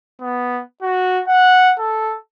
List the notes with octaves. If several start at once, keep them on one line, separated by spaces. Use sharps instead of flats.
B3
F#4
F#5
A4